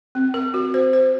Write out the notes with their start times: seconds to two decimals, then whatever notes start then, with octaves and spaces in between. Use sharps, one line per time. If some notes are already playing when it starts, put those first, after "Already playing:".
0.15 C4
0.34 A#4
0.54 F#4
0.74 C5
0.93 C5